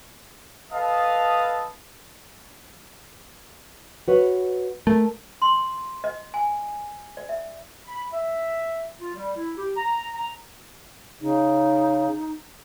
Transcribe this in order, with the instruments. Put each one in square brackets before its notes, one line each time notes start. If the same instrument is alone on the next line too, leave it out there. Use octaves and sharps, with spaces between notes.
[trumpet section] A4 B4 D#5 F5 A5 D#6
[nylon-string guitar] F#4 B4 C#5
[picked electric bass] A3 [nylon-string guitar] A#4
[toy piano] C6
D#5
G#5
D5
E5
[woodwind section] B5
E5
F4
G3
E4
G4
A#5
A#5
[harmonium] C#3 [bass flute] D#4